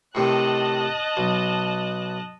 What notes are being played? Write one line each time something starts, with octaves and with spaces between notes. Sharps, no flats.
A2 C3 D#3 D#5 A5 F#6
B1